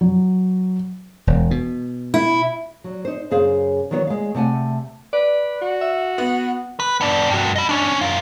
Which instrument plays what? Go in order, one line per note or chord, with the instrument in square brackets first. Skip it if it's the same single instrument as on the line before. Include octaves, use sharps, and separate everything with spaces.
[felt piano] F#3
[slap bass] E1
B2
[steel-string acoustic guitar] E4
[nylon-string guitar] F#3
D#4 C5
F#2 C#3 G#4 C5 F5
D#3 E3 F#3 B3 C#5
G#3 F5
C3 A3 F#5 G#5
[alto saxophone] B4 [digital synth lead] D5
[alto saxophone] F#4
[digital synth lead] E5
[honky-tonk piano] B3 [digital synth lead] F#5
[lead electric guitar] B4
B3 D4
G2 F#4
D#5 B5
C#4 D4
F#2 F4